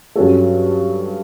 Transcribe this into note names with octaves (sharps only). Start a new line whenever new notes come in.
G2 F#3 C#4 F#4 A4